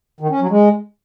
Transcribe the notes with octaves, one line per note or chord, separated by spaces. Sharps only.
D#3
C#4
F#3
G#3